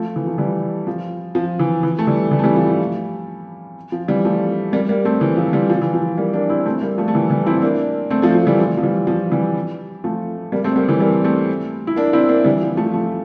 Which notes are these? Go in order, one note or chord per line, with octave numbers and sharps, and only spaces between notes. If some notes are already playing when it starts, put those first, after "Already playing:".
Already playing: F3 A3
E3
F3
E3 G3
F3
F3
E3
E3
A3
E3 G3
E3 G3
A3
E3 G3
F3
F3
F3
E3 G3
F3 A3
G3 A#3
G3 A#3
A3 C4
E3
F3
E3 G3
F3
E3
F3
G3 A#3
A#3 D4
C4 E4
A3 C4
G3 A#3
F3 A3
A3
E3 G3
E3 G3
C4 E4
A#3 D4
A3 C4
F3 A3
F3
E3 G3
F3
F3
E3 G3
F3
E3 G3
F3 A3
G3 A#3
A3 C4
G3 A#3
E3 G3
G3 A#3
A3 C4
E4
A#3 D4
C4 E4
A#3 D4
E3 G3
F3
F3 A3
F3 A3